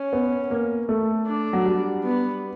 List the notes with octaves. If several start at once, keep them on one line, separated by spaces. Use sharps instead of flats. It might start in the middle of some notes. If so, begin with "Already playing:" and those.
Already playing: C#4
B3
A#3
A3
D4
F#3
G3
B3